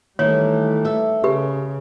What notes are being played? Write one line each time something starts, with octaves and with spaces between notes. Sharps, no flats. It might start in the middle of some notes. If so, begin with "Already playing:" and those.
D#3 E3 G3 A3 C#5
A4 E5
C#3 G4 B4